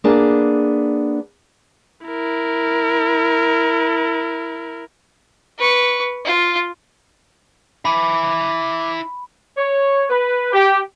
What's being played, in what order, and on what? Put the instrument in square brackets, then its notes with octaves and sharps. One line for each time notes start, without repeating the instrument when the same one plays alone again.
[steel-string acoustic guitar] A#3 B3 D4 G#4
[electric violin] E4 A#4
[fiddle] B4 C#6
F4
[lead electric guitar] E4 G#5 [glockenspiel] B5 [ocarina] D6
[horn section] C#5
B4
G4